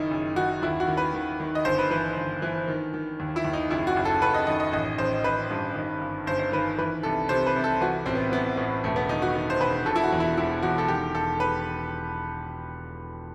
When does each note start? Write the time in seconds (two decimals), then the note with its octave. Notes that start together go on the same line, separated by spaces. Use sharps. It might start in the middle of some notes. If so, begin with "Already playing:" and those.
Already playing: F#1 D#3 D#4 E4
0.11 F#1
0.36 D#3 F#4
0.62 D#2 E4
0.80 F#4
0.88 D#3
0.97 B4
1.14 D#3
1.40 D#3
1.55 D#5
1.65 G1 C5
1.79 B4
1.90 E3 B4
2.17 G1
2.42 E3
2.68 D#3
2.94 D#3
3.20 D#2
3.36 E4
3.45 D#2
3.53 D#4
3.70 F#1 E4
3.87 F#4
3.96 F#1
4.05 A4
4.21 F#1 B4
4.34 D#5
4.47 D#3 D#5
4.60 D#5
4.72 A1 D#5
4.98 A1 C5
5.24 A1 B4
5.50 G2
5.75 D#3
6.01 G1
6.27 G1 C5
6.39 C5
6.52 D#3 B4
6.78 E3 B4
7.03 C2 A4
7.29 C3 C5
7.46 B4
7.56 C2
7.64 A4
7.81 E3 F#4
8.06 A1 C4
8.15 B3
8.32 E3 B3
8.57 A2 B3
8.84 E1 A3
8.96 B3
9.09 D#3 D#4
9.22 F#4
9.35 D#3
9.50 C5
9.60 E1 B4
9.86 B2 A4
9.96 E4
10.04 F#4
10.12 E2
10.20 E4
10.37 E1 E4
10.63 E1 F#4
10.78 A4
10.88 D#3 G4
11.15 E1 A4
11.40 B4